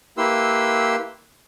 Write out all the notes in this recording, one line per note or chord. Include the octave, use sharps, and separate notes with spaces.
A#3 E4 G4 B4 C6 E6